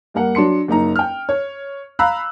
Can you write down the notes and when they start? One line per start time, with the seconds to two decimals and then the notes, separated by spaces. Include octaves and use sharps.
0.14 G2 A#3 A#4 F#5
0.35 F#3 D4 C6 C#7
0.68 F#1 A#3 D#4 A#5
0.96 G5 F6
1.29 C#5
1.99 F5 A#5 B5 E6 F#6